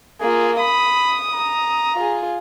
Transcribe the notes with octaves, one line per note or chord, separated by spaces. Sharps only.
A#3 F4 G#4
B5 D#6
A#5
F4 G#4